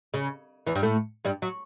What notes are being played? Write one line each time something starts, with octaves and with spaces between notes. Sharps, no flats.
C#3
E2 E3
G2 G3
A2 A3
G2 G3
F#3